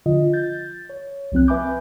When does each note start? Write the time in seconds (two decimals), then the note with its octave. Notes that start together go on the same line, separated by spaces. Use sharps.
0.06 D3 F3 F4 D#5
0.33 G6 A6
0.89 C#5
1.32 C2 F3 C4 F#6
1.47 B4 E5 G#5 B5 D6 G6